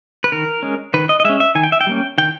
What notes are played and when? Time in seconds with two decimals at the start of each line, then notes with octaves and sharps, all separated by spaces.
0.24 B4
0.32 D#3 A#4
0.63 G#3 C#4
0.94 D#3 B4
1.09 D#5
1.20 D#5
1.24 G#3 C#4 E5
1.40 E5
1.55 D#3 G#5
1.63 G5
1.72 E5
1.81 G5
1.87 G3 A#3 C#4
2.18 D#3 G5